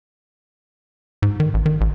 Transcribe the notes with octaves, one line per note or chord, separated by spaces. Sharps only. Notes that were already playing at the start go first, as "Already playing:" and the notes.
G#2
D#3
A1
D#3
A1